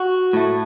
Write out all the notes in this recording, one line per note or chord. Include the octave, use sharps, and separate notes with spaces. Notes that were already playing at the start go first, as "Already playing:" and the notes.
Already playing: F#4
A2 A3